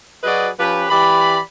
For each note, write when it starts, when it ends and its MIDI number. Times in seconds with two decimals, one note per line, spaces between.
0.24 0.49 54
0.24 0.49 66
0.24 0.49 68
0.24 0.49 71
0.24 0.49 74
0.24 0.49 75
0.60 0.86 53
0.60 0.86 61
0.60 0.86 67
0.60 0.86 71
0.90 1.39 52
0.90 1.39 67
0.90 1.39 74
0.90 1.39 83